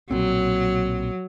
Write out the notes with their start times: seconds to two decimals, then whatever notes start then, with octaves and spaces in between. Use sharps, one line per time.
0.11 B1 A#2 F#3 C4